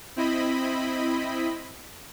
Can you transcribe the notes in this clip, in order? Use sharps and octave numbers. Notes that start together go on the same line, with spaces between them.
C4 E4 D#5 B5